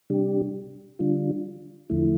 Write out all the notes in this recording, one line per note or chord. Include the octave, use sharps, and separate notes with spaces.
C3 G3 D4 G4
D3 G3 D4 F4
E2 D3 F3 A3 E4